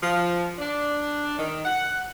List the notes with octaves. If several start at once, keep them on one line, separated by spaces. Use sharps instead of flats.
F3
D4
D#3
F#5